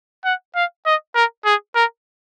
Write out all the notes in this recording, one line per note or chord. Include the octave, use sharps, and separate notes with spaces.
F#5
F5
D#5
A#4
G#4
A#4